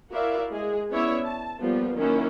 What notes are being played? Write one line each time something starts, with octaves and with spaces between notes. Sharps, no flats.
E4 F#4 A#4 D5 E5 F5
G#3 G#4
B3 C#4 E4 C#5 D5 E5
A5
F3 G3 A#3 B3 F4
D#3 F#3 A#3 C#4 E4